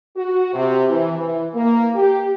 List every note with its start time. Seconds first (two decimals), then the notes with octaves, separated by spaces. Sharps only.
0.17 F#4
0.53 C3
0.89 E3
1.18 E3
1.54 A#3
1.95 G4